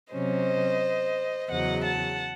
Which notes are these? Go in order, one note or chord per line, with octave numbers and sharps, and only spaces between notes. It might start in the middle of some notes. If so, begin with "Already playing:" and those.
C3 F#3 C#4 C5 D#5
E2 C#3 F#3 D#5 F#5
F#5 A5